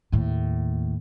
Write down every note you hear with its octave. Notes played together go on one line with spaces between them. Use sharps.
D#2 A2